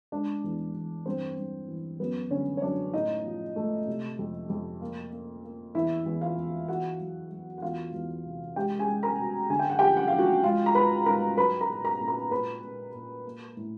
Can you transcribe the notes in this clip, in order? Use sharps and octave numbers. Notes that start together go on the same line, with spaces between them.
G#3 D4 D5
E2
E2
G2 C4 C5
G2
E3
F#2 B3 B4
D3 C#4 C#5
C#5
F#2 D4 D5
A2 D#4 D#5
F3
A3
C3
F2
F2
A#3
A#3
A#3
E2 E4 E5
E2
F4 F5
E2
E2 F#4 F#5
F#3
F#3
F#5
E2 F4 F5
E2
C3
G#3 G4 G5
G#4 G#5
G#3
A#4 A#5
B2
D3 G#5
G5
F#5
F3 G4 G5
F#5
F3 F5
F#4 F#5
G#3 F4 F5
A#5
G#2 B4 B5
G#2 A#4 A#5
F#3 B4 B5
A#4 A#5
A#2
A#4 A#5
A#2
A#4 A#5
A#2 B4 B5
A#2
A#2
A#3
A2